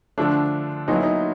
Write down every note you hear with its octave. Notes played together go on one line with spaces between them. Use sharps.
D3 F3 A3 D4
A#2 F#3 B3 D#4
E4
D#4